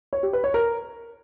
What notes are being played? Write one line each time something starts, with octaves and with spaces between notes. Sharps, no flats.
C#5
G4
B4
C#5
A#4